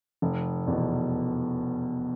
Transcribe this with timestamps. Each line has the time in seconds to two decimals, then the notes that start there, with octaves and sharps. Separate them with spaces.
0.22 F1
0.67 E2 B2